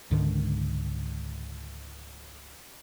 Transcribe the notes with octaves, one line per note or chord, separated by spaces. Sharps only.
C#2 G#2 D3 D#3